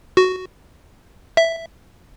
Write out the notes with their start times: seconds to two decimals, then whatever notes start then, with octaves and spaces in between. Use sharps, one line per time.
0.17 F#4
1.37 E5